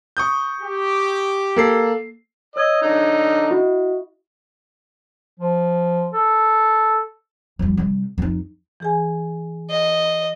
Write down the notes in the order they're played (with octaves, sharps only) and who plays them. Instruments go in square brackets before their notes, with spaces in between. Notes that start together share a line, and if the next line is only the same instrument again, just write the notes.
[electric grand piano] C#6 D#6 G6
[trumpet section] G4
[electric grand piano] A#3 A4 C7
[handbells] C#5 E6 G#6 [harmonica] D#5
[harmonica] D3 D#4
[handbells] E4 F#4 D#5
[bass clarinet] F3
A4
[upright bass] F2 G3
C3 G3
F2 D#4
[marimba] E3 G#4 G#5
[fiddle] D#5